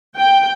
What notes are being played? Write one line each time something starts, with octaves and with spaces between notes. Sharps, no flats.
G5